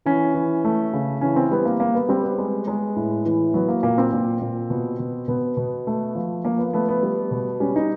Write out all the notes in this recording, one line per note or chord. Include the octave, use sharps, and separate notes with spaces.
E3 C#4
E3
A3
C#3
E3 C#4
C4
G3 B3
A#3
A#3
B3
G3 C4
B3
G#3
G#3
A2
E3
F#3 B3
A#3
A#2 A#3
C4
A#2
A#2
B2
B2
B2 B3
B2
A3
F3
F3 A#3
B3
A3 B3
B3
G3
B2
G3 C#4
D#4